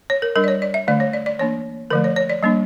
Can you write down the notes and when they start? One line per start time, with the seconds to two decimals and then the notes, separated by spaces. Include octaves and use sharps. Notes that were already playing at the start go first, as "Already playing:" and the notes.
0.10 C#5
0.22 A#4
0.36 G3 D4 A#4
0.44 D5
0.48 C#5
0.62 D5
0.74 E5
0.87 D3 A3 D4 D5
1.00 C#5
1.13 D5
1.26 D5
1.39 E3 A#3 D4 C#5
1.90 D3 F3 A3 A#4
2.04 C#5
2.16 C#5
2.30 D5
2.43 G3 A#3 D4